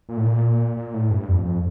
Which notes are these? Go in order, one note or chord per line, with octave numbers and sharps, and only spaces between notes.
A#2
A2
A#2
A#2
A2
G2
F2
F2